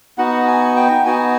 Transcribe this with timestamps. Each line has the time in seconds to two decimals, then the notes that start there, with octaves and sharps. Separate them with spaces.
0.18 B3 D#4 F#4 F#5
0.47 G#5
0.76 G5
1.05 B3 D#4 F#4 G#5